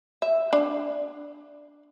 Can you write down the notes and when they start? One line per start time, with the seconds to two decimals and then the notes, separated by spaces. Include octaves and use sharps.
0.22 E5
0.53 D4